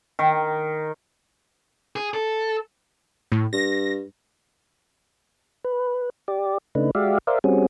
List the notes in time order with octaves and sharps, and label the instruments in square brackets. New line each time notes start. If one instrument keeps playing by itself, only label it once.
[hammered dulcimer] D#3
[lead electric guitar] G#4
A4
[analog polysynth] A2
[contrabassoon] G2 [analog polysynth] A#6
[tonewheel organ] B4
G4 D5
C#3 A3 D4 D#4 B4
G#3 F#4 G4 D5 E5 F5
A#4 C5 D5 E5 F5
G3 C4 C#4 F#4 G#4